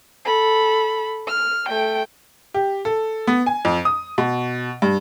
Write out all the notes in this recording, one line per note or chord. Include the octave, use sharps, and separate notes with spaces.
A4 B5
F6
A3 G5
G4
A4
B3
G#5
F2
D#6
B2
G2